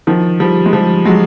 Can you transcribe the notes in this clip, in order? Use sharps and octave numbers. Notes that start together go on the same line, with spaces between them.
D#3 F3
F3 G3
G#3
F3 G3
F#3 G#3